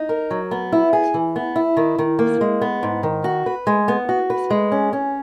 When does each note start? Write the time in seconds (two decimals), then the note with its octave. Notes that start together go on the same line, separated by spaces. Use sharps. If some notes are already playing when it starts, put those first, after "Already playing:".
Already playing: D#4
0.09 A#4
0.31 F#3
0.51 B3
0.72 E4
0.93 G#4
1.14 E3
1.36 B3
1.56 E4
1.77 D#3
1.98 D#3
2.19 A#3
2.41 G#3
2.61 B3
2.83 G#2
3.03 D#3
3.24 F#4
3.46 B4
3.67 G#3
3.88 B3
4.09 F#4
4.30 B4
4.50 G#3
4.72 C#4
4.93 C#4